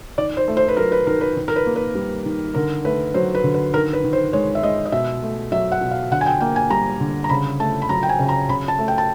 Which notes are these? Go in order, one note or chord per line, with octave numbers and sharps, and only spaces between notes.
D#3 D5
C5
A3
C5
B4
F#3 A#4
B4
D#3 A#4
B4
D#3
A#4
B4
A#3
B4
G3
D#3
D3 A#4
A3 B4
F#3 C5
B4
D3
B4
D#3 A#4
B4
D#3
C5
G#3 C#5
E5
G#3 D#5
D#5
B2 E5
A3
F#3 E5
F#5
B2
F5
D3 F#5
G#5
G5
A#3 G5
G#5
G3 A#5
D3
A#5
C#3 B5
A3 A5
B5
F#3 A#5
G5
G#5
C#3
A#5
C#3 B5
A5
A3
G5
A5